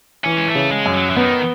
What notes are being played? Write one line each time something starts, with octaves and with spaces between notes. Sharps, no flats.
E3 C#4
G#3
A3
C#3
G#3
F#2
F#3
E3
D#3 B3